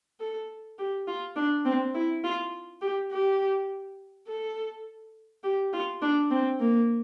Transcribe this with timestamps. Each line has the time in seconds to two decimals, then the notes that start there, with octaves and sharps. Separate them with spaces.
0.20 A4
0.79 G4
1.07 F4
1.36 D4
1.65 C4
1.94 E4
2.24 F4
2.81 G4
3.11 G4
4.28 A4
5.43 G4
5.73 F4
6.02 D4
6.31 C4
6.60 A#3